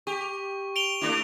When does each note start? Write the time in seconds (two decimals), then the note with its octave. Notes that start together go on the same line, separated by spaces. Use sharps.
0.07 G4 C#6
0.76 D7 F7 G7
1.01 A3 D4 E4